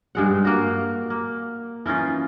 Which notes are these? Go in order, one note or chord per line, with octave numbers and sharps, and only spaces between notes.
G2 G#3 F#5
A#3 F#4
A#3
E3 C#4 D#4 F4